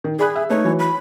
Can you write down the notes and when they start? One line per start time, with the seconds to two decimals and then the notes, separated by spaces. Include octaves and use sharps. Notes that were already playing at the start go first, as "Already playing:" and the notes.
0.04 D#3
0.19 G#4 D5 B5 F#6
0.36 E5
0.50 A3 D#4 B4 C#5
0.64 E3 F#3
0.79 B5